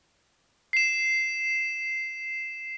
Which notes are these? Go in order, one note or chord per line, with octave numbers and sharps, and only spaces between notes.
C7 E7